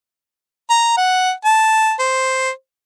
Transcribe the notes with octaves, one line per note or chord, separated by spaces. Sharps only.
A#5
F#5
A5
C5